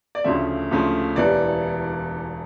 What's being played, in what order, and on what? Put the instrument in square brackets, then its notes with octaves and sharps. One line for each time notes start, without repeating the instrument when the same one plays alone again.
[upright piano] D5
D2 C#3 F3 A3 E5
D2 C#3 F3 A3
E1 E2 E3 G3 D5